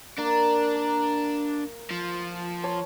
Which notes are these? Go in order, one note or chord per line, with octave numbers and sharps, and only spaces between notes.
A#3 D4
A#4
F3
C#5 A5